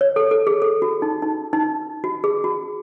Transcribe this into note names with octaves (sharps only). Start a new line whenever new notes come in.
C#5
A4
A4
G#4
A4
F#4
D#4
D#4
D#4
F#4
G#4
F#4